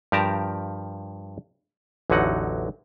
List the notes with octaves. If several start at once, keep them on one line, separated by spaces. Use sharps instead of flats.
G2 F3 G4 A#4 A5 A#5
A1 E2 D3 F#3 D#4 F#5